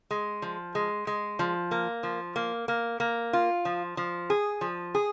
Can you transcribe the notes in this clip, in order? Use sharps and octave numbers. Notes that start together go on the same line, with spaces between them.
G#3
F3
G#3
G#3
F3
A#3
F3
A#3
A#3
A#3
F4
F3
F3
G#4
F3
G#4